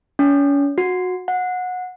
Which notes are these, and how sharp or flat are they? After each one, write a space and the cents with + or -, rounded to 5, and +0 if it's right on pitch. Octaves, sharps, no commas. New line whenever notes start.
C#4 +35
F#4 -20
F#5 -20